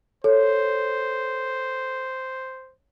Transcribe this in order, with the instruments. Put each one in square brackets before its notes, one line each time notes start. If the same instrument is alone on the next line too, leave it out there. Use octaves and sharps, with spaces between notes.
[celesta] A4 [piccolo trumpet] C5 [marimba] C#5